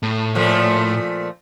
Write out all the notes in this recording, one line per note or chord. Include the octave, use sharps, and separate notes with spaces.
A2
A#2 F3 A3